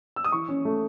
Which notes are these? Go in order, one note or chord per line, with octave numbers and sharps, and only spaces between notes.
E6
D#6
E3 C#6
C#4
A3